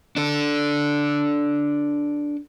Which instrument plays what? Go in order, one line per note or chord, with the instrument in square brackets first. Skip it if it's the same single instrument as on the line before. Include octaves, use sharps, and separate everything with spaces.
[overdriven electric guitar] D4 A4